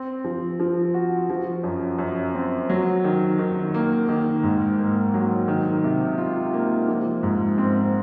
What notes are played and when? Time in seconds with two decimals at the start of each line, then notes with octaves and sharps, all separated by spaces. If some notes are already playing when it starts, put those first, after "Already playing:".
Already playing: C4
0.25 F3
0.60 F3
0.94 F#4
1.30 F3
1.64 F#2
1.99 F#2
2.34 C4
2.70 F#3
3.04 D#3
3.39 D#3
3.74 A#3
4.09 D#3
4.43 G#2
4.79 A#3
5.14 F#3
5.48 D#3
5.84 C3
6.18 F4
6.54 A#3
6.88 F3
7.23 G#2
7.58 C4